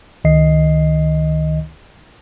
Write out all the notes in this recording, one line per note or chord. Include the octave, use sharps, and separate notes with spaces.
C#2 D#3 D#5 C7